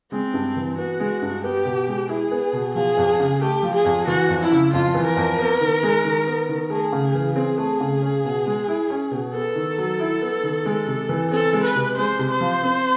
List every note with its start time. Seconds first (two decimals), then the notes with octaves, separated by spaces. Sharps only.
0.12 G#3 C4
0.34 G2
0.56 E3
0.78 B3 F#4
1.00 G#3
1.22 G2
1.44 B3 G4
1.65 B2
1.88 G#3
2.09 E4 G#4
2.31 B3
2.53 B2
2.75 F3 G#4
2.98 F2
3.20 C#3
3.41 A3 G4
3.63 F3
3.74 G#4
3.85 F2
4.07 E3 F#4
4.29 F2
4.41 E4
4.51 C#3
4.73 F2 F4
4.94 E3
5.06 A#4
5.17 F2
5.39 B3
5.61 D#3
5.83 G#3
6.04 D#3
6.27 B3
6.49 D#3
6.70 A3 G#4
6.93 C#3
7.15 E3
7.36 C4 G#4
7.58 A3
7.80 C#3
8.02 C#4
8.25 B2
8.46 G#3
8.68 E4
8.90 C#4
9.11 B2
9.33 B3 A4
9.55 D#3
9.78 F#3
10.00 E4
10.21 B3
10.43 D#3
10.65 G#3
10.87 C3
11.09 E3
11.31 C4 A4
11.53 G#3
11.64 B4
11.75 C3
11.97 G#3 C5
12.19 C3
12.31 C5
12.41 F3
12.63 C4